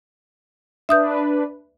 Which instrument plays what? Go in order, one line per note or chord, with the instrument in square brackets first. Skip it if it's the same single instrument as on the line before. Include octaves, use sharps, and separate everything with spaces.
[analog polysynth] D4 B4 [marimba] E5 D#6 G6